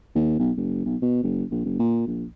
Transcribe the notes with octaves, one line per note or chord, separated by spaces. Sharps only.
D#2
B1
F#1
B1
B2
F#1
A#1
F#1
A#2
A#1